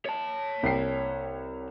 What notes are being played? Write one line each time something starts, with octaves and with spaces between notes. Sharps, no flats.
C#5 A5
C2 G5 C7